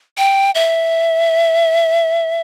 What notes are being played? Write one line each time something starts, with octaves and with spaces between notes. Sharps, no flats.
G5
E5